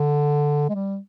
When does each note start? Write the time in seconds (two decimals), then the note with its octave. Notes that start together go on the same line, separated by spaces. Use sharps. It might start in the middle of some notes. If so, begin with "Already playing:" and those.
Already playing: D3
0.69 G#3
0.75 G3